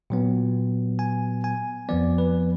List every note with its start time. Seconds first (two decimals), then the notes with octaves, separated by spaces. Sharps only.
0.10 A#2 F#3 B3
0.99 G#5
1.44 G#5
1.89 F2 F3 B3 D5
2.18 B4